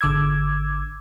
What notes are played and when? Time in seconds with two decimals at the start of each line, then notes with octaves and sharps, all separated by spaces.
0.01 G#1 D3 D6 E6 G#6